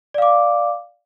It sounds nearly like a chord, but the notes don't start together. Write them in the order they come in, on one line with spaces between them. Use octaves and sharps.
D5 F5 D6